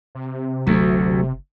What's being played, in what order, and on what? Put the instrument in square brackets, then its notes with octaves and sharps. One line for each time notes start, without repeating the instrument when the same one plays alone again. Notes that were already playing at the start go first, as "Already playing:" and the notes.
[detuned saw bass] C3
[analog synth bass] F#1 [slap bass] D2 [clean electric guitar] F#3 A3